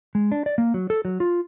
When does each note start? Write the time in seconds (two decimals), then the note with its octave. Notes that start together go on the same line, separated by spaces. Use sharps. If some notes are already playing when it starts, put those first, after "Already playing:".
0.15 G#3
0.32 D4
0.46 D5
0.58 A#3
0.74 F#3
0.90 A4
1.05 F#3
1.20 F4